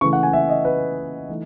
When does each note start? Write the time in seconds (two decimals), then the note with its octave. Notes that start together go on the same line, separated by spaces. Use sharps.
0.01 C#3 E3 A3 C#6
0.13 F#5
0.23 G#5
0.33 E5
0.49 D#5
0.65 B4
1.29 E3 A3 D#4